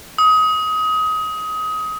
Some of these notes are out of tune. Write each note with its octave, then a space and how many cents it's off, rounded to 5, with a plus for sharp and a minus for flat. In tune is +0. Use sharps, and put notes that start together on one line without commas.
D#6 +25